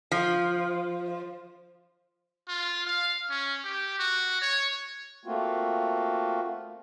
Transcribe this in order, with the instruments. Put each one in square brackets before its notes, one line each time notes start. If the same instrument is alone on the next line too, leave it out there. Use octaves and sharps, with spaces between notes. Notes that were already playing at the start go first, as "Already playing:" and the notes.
[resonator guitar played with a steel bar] F3
[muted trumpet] F4
F5
C#4
G4
F#4
C#5
[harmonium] A3 A#3 C4 F4 F#4